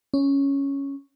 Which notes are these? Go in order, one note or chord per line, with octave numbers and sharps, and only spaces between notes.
C#4